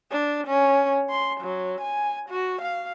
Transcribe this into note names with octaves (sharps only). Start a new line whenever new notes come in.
D4
C#4
C6
F#3
G#5
F#4
F5